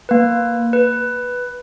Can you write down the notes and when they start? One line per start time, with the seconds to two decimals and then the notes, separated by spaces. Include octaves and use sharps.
0.09 A#3 B4
0.73 B4